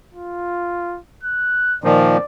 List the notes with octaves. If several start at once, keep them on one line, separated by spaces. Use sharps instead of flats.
F4
F#6
A#2 D#3 F3 D5